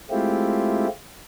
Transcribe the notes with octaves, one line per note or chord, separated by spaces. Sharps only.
G#3 A3 C4 E4 F4 G4